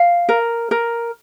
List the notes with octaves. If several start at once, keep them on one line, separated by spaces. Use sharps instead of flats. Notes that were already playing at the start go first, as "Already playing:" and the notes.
Already playing: F5
A#4
A#4